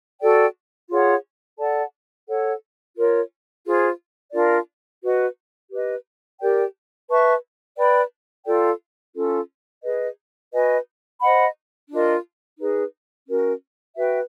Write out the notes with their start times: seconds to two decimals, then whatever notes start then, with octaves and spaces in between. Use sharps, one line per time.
0.21 F#4 A4 D5 G5
0.90 F4 G#4 C#5 F#5
1.58 A4 D5 F#5 A5
2.27 A4 C#5 F#5
2.96 F4 A#4 C#5
3.65 F4 G#4 C5
4.33 D4 F4 A#4 D5
5.02 F#4 B4 D#5
5.71 G4 B4 D#5
6.40 G4 A#4 D5 G5
7.09 B4 E5 A5 C#6
7.78 B4 D5 G5 B5
8.46 F4 A4 D5 G5
9.15 C#4 F4 A4
9.84 G#4 B4 D#5
10.52 F#4 B4 D#5 G#5
11.21 C5 D#5 F#5 B5
11.90 D4 F4 A#4 D#5
12.59 D#4 G#4 B4
13.27 C#4 F#4 A#4
13.96 F#4 B4 E5 G5